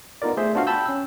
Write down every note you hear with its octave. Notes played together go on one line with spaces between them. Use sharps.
B3 D#4 F4 A#4 D5
A3 G#4 C5 E5
B3 D4 F4 F#4 F5 F6
G5 A5 B5 E6 G6
C#4 E6